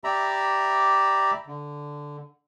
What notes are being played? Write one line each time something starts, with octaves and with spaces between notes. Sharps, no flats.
G4 D5 E5 A#5 B5
D3